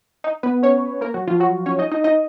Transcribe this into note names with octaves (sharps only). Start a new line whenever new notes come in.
D#4
B3 B4
C#4 C#5
A#3 A#4
F#3 F#4
F3 F4
F#3 F#4
C#4 C#5
D#4 D#5
D#4 D#5
D#4 D#5